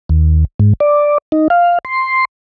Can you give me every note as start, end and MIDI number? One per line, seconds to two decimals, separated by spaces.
0.09 0.45 39
0.59 0.73 44
0.80 1.18 74
1.32 1.48 63
1.50 1.78 77
1.85 2.25 84